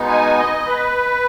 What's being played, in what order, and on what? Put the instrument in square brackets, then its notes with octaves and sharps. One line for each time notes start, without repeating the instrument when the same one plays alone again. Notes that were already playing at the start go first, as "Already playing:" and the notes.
Already playing: [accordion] B2 G#3 B3 D#4
G#5
D#5
B4